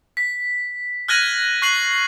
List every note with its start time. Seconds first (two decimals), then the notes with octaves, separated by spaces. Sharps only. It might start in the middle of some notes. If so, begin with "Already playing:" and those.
0.17 B6
1.08 F6 F#6 G#6 A#6 D#7 F#7
1.62 C#6 F#6 C7 F#7